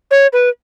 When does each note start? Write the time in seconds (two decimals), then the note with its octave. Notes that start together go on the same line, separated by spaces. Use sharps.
0.11 C#5
0.33 B4